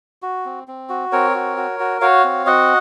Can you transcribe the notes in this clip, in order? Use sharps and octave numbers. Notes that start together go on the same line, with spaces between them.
F#4
C4
C4
F#4
C4 A#4 C#5
F#4
F#4
F#4
F#4 C#5 F5
C4
F#4 D#5 F#5